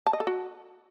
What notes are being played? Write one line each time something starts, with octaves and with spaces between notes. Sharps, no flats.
A5
D#5
A4
F#4